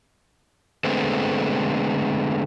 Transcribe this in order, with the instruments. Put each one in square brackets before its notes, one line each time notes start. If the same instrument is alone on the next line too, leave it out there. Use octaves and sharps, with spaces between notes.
[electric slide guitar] D3 G#3 A3 B3 C4